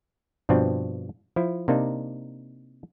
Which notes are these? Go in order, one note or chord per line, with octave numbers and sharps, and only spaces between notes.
G2 B2 F3 C4 D4
F3 E4
C3 A#3 D4 D#4